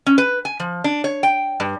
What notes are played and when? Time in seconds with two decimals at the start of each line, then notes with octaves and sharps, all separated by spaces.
0.06 C#4
0.18 B4
0.45 G#5
0.60 F3
0.84 D4
1.04 C#5
1.23 G5
1.60 G2